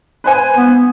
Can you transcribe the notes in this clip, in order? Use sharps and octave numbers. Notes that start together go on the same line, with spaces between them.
B4 C5 G#5
B3